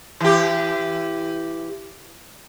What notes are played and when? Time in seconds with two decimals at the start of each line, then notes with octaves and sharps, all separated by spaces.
0.20 E3 G4